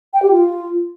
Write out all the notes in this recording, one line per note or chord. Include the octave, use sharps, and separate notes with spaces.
G5
G4
F4